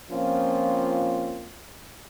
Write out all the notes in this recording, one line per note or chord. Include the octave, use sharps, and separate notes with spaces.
F3 A#3 C4 C#4 F4